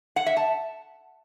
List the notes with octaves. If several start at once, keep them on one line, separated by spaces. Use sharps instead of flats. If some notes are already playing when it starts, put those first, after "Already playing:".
F#5
E5
A5